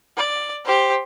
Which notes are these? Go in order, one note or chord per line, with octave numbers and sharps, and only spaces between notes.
D5
G4 C5